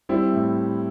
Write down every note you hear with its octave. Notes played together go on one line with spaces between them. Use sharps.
G3 C4 E4
A2